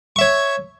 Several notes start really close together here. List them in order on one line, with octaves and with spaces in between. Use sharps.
C#6 E5 C#5